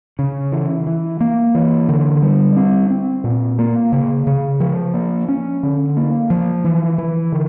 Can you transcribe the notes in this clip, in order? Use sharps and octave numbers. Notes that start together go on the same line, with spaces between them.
C#3
E3
E3
A#3
E3
D3
G3
C4
C4
A#2
A#3
C#3
C#3
F3
A#3
C#4
D3
A#3
F3
E3
E3
D3